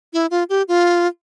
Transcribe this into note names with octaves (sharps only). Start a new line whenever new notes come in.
E4
F4
G4
F4